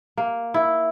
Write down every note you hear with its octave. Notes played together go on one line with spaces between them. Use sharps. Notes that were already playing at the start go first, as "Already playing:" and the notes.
A#3
E4